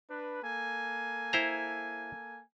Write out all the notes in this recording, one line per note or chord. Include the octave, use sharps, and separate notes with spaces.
D4 B4
A#3 A4 G#5
E4 C5 A#5